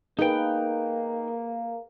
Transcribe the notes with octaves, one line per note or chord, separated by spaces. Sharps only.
A#3 D#4 G#4 B4 G5